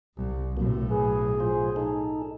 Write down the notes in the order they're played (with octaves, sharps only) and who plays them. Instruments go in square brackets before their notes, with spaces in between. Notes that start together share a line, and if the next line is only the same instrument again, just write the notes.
[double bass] C2
[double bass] B1 A2 [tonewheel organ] C3 F#3 A#3
[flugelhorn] G#4 [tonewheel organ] B4
[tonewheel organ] F4 C5
D#4 A4